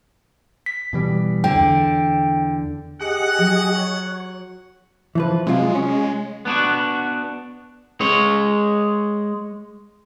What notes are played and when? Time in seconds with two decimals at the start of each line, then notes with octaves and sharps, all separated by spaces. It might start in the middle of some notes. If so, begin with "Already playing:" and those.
0.66 B6
0.93 B2 E3 G3
1.44 D3 G5
1.56 E2
3.00 G4 G#4 D#5 F#5
3.39 F#3
3.76 C#5
5.15 E3 F3 B4
5.47 C3 F#3 G#3 F4
5.75 C#4
6.45 B3 D4 F#4
8.01 G#3 C#5